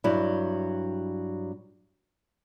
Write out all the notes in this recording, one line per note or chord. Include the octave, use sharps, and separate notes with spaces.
G2 F#3 E4